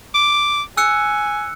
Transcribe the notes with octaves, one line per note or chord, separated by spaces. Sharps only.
D6
G#5 E6 F#6 C#7